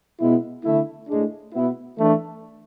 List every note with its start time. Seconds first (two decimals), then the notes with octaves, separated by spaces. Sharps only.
0.20 B2 G#3 B3 E4
0.65 D3 A3 E4
1.08 A2 G#3 D4
1.53 B2 B3 E4
1.98 E3 A3 D4